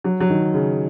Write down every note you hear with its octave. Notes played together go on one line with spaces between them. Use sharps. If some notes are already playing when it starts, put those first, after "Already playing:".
F#3
F#3
D#3
C#3